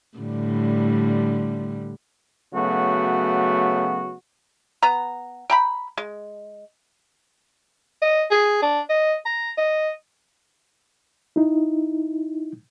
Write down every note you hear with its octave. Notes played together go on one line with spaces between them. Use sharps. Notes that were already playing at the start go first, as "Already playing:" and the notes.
A2 D3 G3
C#3 F#3 A3 B3 F#4
B3 A#5
G5 A#5 B5
G#3
D#5
G#4
D4
D#5
A#5
D#5
D#4 E4